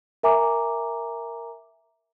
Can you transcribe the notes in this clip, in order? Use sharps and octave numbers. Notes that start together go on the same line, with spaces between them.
A#4 E5 G#5 A#5 D6